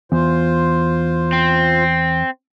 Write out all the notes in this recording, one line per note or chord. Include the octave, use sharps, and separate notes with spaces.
E2 F4 C5
C4